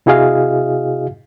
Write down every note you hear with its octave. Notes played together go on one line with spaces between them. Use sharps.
C3 E4 F#4 G#4 D#5 F5